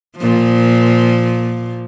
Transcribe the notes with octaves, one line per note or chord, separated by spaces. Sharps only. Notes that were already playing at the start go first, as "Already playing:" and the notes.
A#2 F3